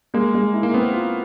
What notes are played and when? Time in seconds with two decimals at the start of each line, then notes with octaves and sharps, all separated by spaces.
0.14 G#3 A#3
0.34 G#3
0.54 E4
0.63 A#3
0.74 B3 C4
0.94 F4